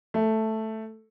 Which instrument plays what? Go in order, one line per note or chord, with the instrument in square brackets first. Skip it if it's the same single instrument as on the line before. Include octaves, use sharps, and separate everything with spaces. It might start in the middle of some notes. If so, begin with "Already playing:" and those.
[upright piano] A3